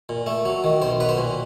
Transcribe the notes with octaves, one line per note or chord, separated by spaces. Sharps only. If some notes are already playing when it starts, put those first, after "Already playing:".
A#2
A3
F#3
D#3
B1 C5
F#3 B4
C5
A#2